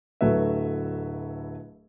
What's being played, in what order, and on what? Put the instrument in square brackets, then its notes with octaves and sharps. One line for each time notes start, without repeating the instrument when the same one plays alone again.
[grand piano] D1 F#3 A3 B4 E5